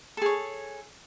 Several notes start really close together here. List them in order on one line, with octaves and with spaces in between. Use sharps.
A4 G#4 C#5